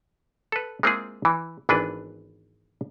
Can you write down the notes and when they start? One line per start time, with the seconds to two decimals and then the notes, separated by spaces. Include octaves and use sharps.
0.52 A4 B4
0.83 G#3 A#3 C4 E4 F4 G#4
1.25 E3
1.69 G#1 E3 B3 D4 A4 B4